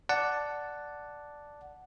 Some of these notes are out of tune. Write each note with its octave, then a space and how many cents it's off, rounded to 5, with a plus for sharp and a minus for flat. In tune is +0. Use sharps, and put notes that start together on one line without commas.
D5 +0 F#5 +0 A5 +0